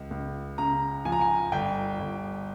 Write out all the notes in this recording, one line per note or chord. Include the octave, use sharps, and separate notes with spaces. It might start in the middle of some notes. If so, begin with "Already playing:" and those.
Already playing: C#2
C#2
C#3 A#5
F3 G#5
A#5
G#5
G1 G5
G1